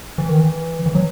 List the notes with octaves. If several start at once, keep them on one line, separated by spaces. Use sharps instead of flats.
E3
D#3
E3
E3
F#3